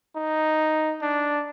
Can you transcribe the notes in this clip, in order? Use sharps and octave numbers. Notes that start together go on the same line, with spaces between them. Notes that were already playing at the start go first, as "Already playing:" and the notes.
D#4
D4